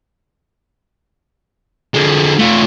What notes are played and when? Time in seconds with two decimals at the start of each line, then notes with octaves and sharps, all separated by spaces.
1.94 D3 G#3
2.39 A3 F4